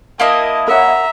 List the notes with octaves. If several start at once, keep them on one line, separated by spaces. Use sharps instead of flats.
A#3 E4 D#5 A5
A#4 C#5 E5 F#5 A#5